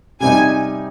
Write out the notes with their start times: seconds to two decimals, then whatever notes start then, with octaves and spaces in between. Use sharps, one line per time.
0.20 C3 G3 C4 D#4 G#5